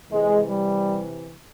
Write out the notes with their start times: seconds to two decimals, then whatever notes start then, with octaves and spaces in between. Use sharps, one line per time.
0.11 C3 E3 G#3
0.48 G3